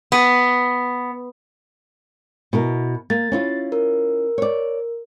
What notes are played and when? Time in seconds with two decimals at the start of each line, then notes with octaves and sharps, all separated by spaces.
0.12 B3
2.53 B2 E4 A#4
3.10 A#3 A6
3.32 C#4 E4 F4
3.72 A#4
4.38 C#5 D5